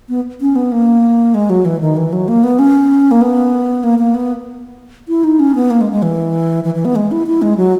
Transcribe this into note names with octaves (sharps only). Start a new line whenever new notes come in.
B3
C#4
B3
A#3
G#3
F#3
E3
D#3
E3
F#3
A#3
B3
C#4
A#3
B3
A#3
A#3
B3
E4
D#4
C#4
B3
A#3
G#3
G#3
E3
E3
E3
B3
G#3
E4
E4
G#3
F#3